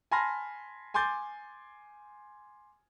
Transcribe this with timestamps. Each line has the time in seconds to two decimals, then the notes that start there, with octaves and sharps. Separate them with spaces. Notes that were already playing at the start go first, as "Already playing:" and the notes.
0.11 G#5 A5 B5 C6 F6 A#6
0.94 G#5 C6 D6 G6 A6